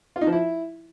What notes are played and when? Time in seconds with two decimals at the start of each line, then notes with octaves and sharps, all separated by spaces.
0.16 F4
0.21 D#4
0.27 F3
0.32 E4